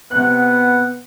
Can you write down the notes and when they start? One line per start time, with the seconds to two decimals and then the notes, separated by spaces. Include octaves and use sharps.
0.11 C3 B3 F#5 F#6